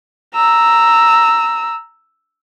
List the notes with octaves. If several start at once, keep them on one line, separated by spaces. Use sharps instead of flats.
A#5 E6